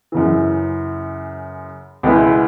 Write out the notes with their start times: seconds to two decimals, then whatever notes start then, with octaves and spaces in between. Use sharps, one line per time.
0.12 F#2 C#3 E3
2.03 C#2 B2 G#3 B3 E4